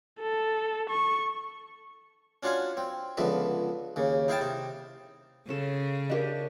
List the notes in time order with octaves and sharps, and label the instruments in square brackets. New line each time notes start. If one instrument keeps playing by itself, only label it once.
[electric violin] A4
C#6
[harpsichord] C#4 D4 F4 F#4 F5 G#5
C4
C#2 D3 F3 B3 E5
D#2 C#3
D#4 E4 F5 G5 A5
C3 D#4
[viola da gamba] C#3 [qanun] C#4 A4
[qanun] D4 G4 [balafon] A#4 D#5